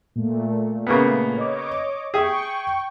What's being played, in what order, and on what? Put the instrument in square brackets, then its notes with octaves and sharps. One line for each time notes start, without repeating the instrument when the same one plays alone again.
[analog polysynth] A#2 A3
[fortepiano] C#3 A#3 B3
[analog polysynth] C#5 D#5 D6
[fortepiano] G#4 E5 [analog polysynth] G5 C#6